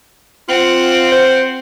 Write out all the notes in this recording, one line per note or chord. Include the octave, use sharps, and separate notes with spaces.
C4 F4 F#5
C5